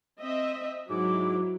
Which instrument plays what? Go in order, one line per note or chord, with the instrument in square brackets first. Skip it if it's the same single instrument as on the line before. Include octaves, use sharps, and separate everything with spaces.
[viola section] C4 D#5 E5
[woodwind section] G#2 D6 [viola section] F#3 E4